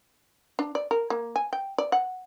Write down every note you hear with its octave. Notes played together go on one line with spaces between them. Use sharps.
D4
D5
A#4
A#3
G#5
G5
D5
F#5